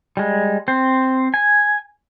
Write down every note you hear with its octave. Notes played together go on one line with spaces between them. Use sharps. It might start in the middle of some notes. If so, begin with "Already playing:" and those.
G3 G#3
C4 C5
G#5